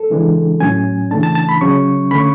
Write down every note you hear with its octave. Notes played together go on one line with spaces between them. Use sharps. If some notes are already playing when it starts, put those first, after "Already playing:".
Already playing: A4
C#3 E3 G#3 D4
A2 F#3 C#4 G#5
C#3 E3 A3 D4 A5
A5
A5
B5
C#3 F#3 C#4 C#6
D3 A3 C#4 B5
C#6